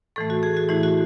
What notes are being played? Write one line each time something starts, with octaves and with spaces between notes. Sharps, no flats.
A2 E3 A3 A4
F#4
G#4
F#4
A2 E3 A3 E4
F#4